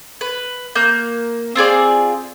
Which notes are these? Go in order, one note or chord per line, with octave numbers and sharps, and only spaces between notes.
B4
A#3 G6
C4 F4 G#4 D5